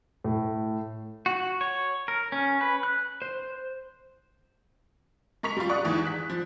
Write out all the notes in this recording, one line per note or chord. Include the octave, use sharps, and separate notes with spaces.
A2
F#4
C#5
A#4
C#4
B4
F#6
C5
G#3 A#4 C#6 B6 F7
G3 F4
D5 C#6 D#6 F#6
E2 G#2 E3
F#6 B6
F3